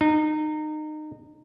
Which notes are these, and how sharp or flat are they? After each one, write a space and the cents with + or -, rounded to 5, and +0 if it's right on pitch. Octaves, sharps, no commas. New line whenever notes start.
D#4 -25